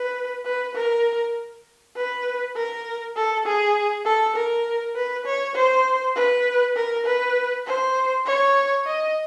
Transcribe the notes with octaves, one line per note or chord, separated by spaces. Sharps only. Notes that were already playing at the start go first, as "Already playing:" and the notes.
Already playing: B4
B4
A#4
B4
A#4
A4
G#4
A4
A#4
B4
C#5
C5
B4
A#4
B4
C5
C#5
D#5